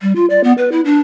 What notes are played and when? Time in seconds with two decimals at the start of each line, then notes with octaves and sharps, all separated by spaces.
0.02 G3
0.16 F4
0.30 D5
0.44 B3
0.58 B4
0.72 E4
0.85 D4